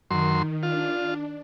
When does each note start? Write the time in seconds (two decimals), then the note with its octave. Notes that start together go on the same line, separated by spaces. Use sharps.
0.11 F#2 D#3 C6
0.63 D4 F4